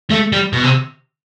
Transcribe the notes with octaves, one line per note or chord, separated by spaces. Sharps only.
A3
G3
B2
C3